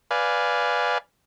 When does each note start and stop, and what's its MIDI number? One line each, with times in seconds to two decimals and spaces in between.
0.11 0.98 71
0.11 0.98 74
0.11 0.98 77
0.11 0.98 80